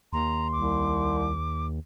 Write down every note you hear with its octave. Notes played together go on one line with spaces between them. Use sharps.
D#2 A#5 C6
C2 D6